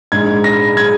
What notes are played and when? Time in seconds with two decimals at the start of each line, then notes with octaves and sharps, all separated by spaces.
0.12 A#1 G#2 G#3 G#6
0.44 A#6
0.77 G#3 G#6